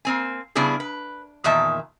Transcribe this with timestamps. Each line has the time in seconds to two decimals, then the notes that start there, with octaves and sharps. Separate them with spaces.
0.05 A#3 C4 G#5
0.55 C#3 G3 B3 D4 E4 G#4
0.80 B4
1.44 E2 A#2 D#3 E5 A5